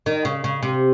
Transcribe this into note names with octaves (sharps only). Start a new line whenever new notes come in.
D#3
C#3
C#3
C3